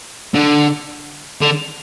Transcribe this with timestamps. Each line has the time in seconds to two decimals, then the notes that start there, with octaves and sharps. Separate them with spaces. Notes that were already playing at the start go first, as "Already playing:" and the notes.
0.34 D3
1.42 D3